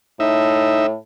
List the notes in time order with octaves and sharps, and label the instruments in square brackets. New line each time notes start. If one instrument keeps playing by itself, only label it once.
[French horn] A2 [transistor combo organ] D#4 E5